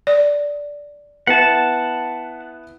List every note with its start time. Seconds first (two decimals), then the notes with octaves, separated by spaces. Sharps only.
0.07 D5
1.27 B3 E4 B4 F#5 A5